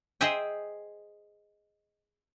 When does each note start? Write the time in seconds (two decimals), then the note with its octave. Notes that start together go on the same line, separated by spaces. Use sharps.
0.21 G#4 C5 D#5 E5 G5